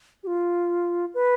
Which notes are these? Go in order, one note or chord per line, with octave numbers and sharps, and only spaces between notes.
G4
F4
B4